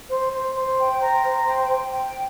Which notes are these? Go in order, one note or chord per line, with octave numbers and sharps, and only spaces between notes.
C5
C5
C5
G5
A#5
C5
G5
G5
G5